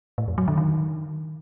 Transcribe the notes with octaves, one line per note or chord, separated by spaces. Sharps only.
A2
F2
F#3
D3
D#3